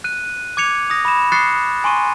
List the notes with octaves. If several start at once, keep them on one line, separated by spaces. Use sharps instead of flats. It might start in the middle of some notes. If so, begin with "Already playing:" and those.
F#6 D#7
D6 G#6 C#7 F7
D#6 A#6
B5 E7
C#6 D#6 F#6 A6 C7 C#7
G#5 C6 C#6 D#7